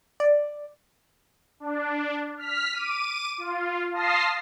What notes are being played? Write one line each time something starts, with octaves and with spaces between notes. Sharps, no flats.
D5
D4
F6 B6
D6 D#7
F4
F5 A5 C6 D#6 A#6 C7